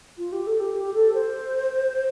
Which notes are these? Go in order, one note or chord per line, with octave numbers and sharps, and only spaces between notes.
F4
G4
A4
G4
G4
A4
C5